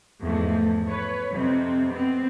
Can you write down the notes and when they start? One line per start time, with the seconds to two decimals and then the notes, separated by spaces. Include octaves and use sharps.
0.23 E2 G#2 F3 A3
0.87 B4 C#5
1.31 F2 C3 C4
1.91 B3 C4